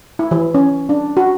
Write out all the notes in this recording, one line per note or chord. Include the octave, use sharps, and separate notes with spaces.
E4
E3
C#4
D4
F#4